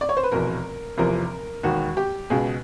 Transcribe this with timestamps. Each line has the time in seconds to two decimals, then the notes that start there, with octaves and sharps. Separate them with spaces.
0.01 D5
0.09 C#5
0.17 C5
0.23 B4
0.32 F1 E2 B2 A#4
0.97 F1 E2 C3 F3 A#4
1.63 E1 D#2 D#3 F#4
1.97 G4
2.30 C#2 B2 G#4